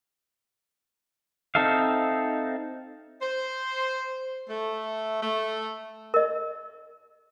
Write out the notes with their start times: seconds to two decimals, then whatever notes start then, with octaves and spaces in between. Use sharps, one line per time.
1.55 C4 D#4 A4 E5 F5
3.22 C5
4.49 A3
5.23 A3
6.14 A#4 D#5